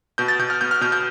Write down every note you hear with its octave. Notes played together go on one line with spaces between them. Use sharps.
B2 G6
A6
B2 G6
F6
B3 G6
F6
B2 G6
G6